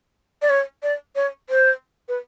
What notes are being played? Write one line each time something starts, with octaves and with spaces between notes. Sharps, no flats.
D5
C#5
D5
C#5
C5
B4